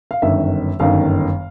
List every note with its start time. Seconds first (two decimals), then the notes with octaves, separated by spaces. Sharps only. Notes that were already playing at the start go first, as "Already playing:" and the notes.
0.11 F5
0.22 G1 F#2 D#3 E5
0.80 G1 F#2 D#3 F5